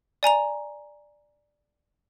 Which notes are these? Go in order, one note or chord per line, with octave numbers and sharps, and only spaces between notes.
D5 G#5 A#5 F7